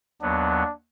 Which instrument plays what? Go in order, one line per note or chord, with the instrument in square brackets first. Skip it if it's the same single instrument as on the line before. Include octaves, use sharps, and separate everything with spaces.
[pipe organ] D#2 F#3 B3 [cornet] D4